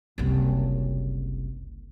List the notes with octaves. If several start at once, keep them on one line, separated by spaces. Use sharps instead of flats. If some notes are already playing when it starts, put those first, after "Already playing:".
F#1 C2